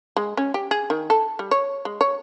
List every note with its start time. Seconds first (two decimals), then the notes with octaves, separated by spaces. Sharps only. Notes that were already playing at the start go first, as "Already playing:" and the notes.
0.16 G#3
0.37 C#4
0.54 G4
0.71 G#4
0.90 D#3
1.10 A4
1.39 G3
1.51 C#5
1.85 G#3
2.01 C#5